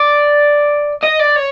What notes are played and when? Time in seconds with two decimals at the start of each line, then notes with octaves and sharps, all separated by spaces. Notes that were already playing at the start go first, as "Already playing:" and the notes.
Already playing: D5
1.03 D#5
1.19 D5
1.36 C#5